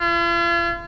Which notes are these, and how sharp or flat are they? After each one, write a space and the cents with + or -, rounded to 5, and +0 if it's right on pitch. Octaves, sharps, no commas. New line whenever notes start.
F4 -45